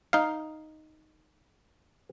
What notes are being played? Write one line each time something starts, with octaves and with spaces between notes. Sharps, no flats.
D#4 F5